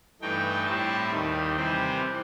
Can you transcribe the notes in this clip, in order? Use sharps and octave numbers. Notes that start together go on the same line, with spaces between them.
G2 E3 A3 D#4 G5
A2 G3 C4 E4 A5
D#2 D#3 G3 D#4
C3 E3 G3 C4 C5